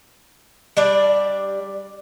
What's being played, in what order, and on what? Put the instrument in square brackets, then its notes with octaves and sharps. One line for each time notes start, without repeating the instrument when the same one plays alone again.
[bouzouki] G3 D4 D5